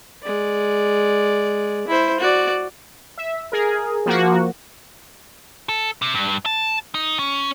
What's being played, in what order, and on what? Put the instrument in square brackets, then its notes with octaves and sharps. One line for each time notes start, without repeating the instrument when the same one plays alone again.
[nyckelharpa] G#3 D5
E4 C5
F#4 D5
[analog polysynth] E5
G#4 A#4
F3 A#3 F#4
[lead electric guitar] A4
C3
G2
A5
D#4
C#4